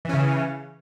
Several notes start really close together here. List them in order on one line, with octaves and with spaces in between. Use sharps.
E3 C#4 C#3